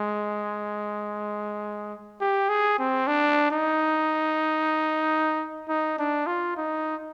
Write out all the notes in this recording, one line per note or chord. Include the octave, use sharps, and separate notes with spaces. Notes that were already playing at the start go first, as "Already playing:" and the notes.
Already playing: G#3
G4
G#4
C4
D4
D#4
D#4
D4
F4
D#4